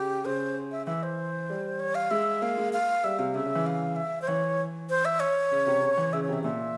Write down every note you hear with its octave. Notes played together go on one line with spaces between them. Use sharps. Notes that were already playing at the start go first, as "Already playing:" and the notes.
Already playing: C#3 G4
C#3 C5
E5
E3 E5
C5
G3
C#5
F5
G#3 E5
A#3 F5
G#3
F5
G3 E5
C3 F5
C#3 E5
C#3
E3
F5
E5
C5
E3 C#5
C5
E5
C#5
C#3
C3
C#3
E3
C#3 E5
C#5
C3
E5
A#2 E5